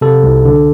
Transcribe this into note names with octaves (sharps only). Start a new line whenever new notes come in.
C3 A4
C2
D3